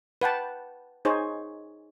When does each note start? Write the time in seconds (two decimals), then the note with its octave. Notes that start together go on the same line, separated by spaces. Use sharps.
0.21 B4 F#5 G5 A5
1.05 D#4 G#4 C5 C#5